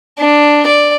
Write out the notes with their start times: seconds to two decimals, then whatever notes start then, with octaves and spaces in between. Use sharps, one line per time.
0.19 D4
0.66 D5